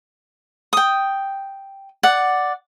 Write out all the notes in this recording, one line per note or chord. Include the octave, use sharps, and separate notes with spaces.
G5 D#6
D5 F#5